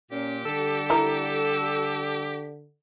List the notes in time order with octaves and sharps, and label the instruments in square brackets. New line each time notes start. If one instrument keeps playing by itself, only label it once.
[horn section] A#2 [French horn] C#4 [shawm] G4
[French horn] D3 [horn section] G3 A4
[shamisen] E4 A#4